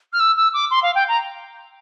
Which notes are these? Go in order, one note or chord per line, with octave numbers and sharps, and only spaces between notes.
F6
E6
E6
D6
C6
F5
G5
A#5